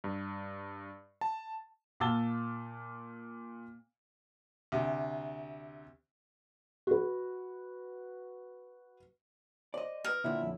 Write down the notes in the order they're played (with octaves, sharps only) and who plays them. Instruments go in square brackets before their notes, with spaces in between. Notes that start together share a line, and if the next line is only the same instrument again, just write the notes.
[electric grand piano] G2
A5
[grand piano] A#2 F5 A5 E6 A6 G7
[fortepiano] D2 C3
[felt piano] F#4 B4
[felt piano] C5 [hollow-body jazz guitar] D5 D#5
[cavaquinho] A#4 [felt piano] B4 D#6 E6
[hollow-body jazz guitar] A#2 D3 [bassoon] E4 [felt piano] F4 G5
[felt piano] F2 C#4